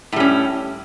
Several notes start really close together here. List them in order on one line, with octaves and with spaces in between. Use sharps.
A2 G3 C#4